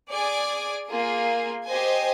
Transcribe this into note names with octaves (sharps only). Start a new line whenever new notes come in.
G#4 D5 G#5
A#3 F4 G#4
G4 C5 D#5 G#5